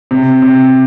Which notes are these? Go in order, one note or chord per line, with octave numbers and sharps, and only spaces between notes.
C3
C3